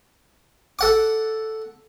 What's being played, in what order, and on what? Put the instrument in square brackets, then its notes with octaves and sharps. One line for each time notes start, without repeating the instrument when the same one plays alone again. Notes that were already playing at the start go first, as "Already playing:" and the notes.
[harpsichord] A4 F#5 D6